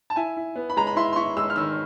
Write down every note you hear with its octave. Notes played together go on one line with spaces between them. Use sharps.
A5
E4 G#5
E4
B3
B5
G#3 A#5
B5
E4 C6
C6
E4 C#6
G#3 E6
F6
D#3 E6